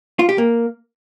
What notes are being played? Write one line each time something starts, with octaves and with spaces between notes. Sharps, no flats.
F4
G4
A#3